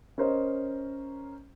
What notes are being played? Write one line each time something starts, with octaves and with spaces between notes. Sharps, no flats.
C#4 A#4 C5 C#5 D#5